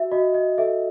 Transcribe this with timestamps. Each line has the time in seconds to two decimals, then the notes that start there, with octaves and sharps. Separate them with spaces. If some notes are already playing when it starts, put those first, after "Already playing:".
Already playing: F#4 E5
0.12 F#4 D#5
0.34 D#5
0.58 A4 E5